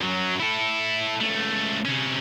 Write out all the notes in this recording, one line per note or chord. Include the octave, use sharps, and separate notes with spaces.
F#2 F#3
E4 A4
C#2 A3
C3 C#4